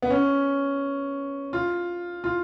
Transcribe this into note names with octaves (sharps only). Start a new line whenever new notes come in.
B3
C#4
F4
F4